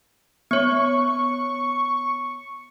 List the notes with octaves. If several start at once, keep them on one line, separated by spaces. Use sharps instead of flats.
B3 C#5 C#6